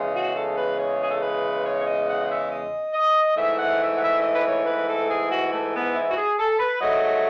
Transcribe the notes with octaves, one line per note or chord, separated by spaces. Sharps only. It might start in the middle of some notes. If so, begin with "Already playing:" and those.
Already playing: E2 C#3 G#3
F#4
A4
B4
C#5
G#4
A4
B4
C#5
C#5
D#5
F#5
D#5
E5
D#5
D#5
G#2 E3 A3 E5
F#5
E5
F#5
E5
D#5
B4
C#5
B4
A4
G#4
F#4
A3
B3
E4
F#4
G#4
A4
B4
G#2 F#3 A3 D#5
D#5